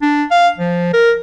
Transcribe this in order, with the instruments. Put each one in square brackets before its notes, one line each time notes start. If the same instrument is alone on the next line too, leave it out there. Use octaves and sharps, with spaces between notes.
[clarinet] D4
F5
F3
A#4